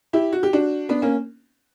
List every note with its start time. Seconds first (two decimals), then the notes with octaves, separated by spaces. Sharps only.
0.13 E4 G4
0.33 F#4
0.43 G4
0.53 D4 F#4
0.89 B3 D4
1.02 A#3 C#4